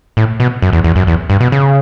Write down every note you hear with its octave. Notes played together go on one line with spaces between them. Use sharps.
A2
B2
F#2
E2
E2
F#2
E2
G2
B2
C#3